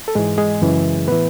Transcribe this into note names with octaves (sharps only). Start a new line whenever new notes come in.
A4
G#2 E3 G#3 G#4
G#3 G#4
F#2 C#3 E3
A2 E3 B3 B4